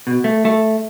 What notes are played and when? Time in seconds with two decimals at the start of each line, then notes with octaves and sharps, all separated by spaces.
0.07 B2
0.24 A3
0.45 A3